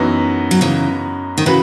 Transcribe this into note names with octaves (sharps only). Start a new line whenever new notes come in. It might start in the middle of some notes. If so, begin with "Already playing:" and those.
Already playing: F#2 E3 B3 D#4
F#3
C#3 E3
D#3
C#3 E3 F#4 B4